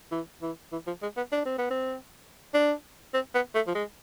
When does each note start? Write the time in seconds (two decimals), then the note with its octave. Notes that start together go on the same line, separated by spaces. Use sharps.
0.11 E3
0.42 E3
0.72 E3
0.87 F3
1.02 G#3
1.17 B3
1.32 D4
1.46 C4
1.58 B3
1.71 C4
2.54 D4
3.14 C4
3.35 B3
3.55 A3
3.67 F3
3.75 G#3